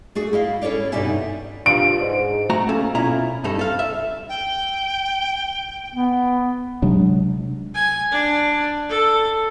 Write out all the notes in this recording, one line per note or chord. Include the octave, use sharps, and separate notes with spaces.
A3 F#4 G#4
E4 D#5 F5
C#4 E4 A4 C#5 D5
G2 B2 G3 D#4 E5 G#5
G2 D4 F4 D7
G#2
A3 F#4 A#5
A#3 C#4 A4
B2 C#4 E4 F4 A#5
G2 G3 D#4 A4
A4 F5
E5
G5
B3
C3 F#3 G#3 D4
G#5
D4
A4